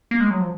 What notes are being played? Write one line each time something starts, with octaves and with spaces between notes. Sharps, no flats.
A#3
G#3
F#3
F3